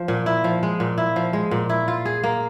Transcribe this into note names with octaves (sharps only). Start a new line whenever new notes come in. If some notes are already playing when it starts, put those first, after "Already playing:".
Already playing: F3
A#2
E4
F3
G#3
A#2
E4
F3
G#3
A#2
E4
F4
G#4
A#3